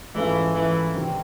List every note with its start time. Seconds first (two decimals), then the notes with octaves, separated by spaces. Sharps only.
0.15 G#2 E3 F3 A3 C#4 F4
0.55 E3
0.95 C3 D#3 G3 C4